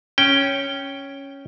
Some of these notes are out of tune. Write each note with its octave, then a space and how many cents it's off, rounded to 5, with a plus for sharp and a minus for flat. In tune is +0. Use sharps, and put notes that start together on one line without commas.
C#4 +0 G5 +0